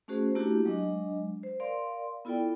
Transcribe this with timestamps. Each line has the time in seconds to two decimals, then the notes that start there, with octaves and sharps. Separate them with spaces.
0.08 A3 C#4 F#4 G#4 C5
0.35 A3 A#3 D4 E4 F#4 G4
0.65 F#3 G#3 D4 D#5
1.43 C5
1.60 A#4 D5 F5 C6
2.25 B3 E4 F4 A4 D5 G5